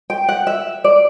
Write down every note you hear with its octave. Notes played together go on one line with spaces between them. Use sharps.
G5
F#5
E5
D5